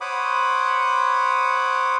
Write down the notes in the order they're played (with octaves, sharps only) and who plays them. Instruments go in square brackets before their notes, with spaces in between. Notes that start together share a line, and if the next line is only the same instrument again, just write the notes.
[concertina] C5 C#5 F#5 B5 D6 D#6